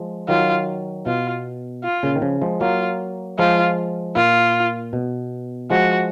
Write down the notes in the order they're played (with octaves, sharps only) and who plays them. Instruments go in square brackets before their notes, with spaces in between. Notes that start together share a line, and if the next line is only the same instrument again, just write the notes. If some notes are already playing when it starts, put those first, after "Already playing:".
Already playing: [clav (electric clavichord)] F3 G#3
[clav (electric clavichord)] D#3 F#3 [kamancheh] F4
[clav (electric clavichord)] B2 [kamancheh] F4
[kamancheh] F4
[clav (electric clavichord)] A#2 C#3
D#3
C#3 F3
F3 G#3
[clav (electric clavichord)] F#3 A#3 [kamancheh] F4
[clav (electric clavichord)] F3 G#3 [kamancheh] F4
[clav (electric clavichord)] A#2 [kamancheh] F4
[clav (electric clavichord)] B2
[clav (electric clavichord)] F3 G#3 [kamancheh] F#4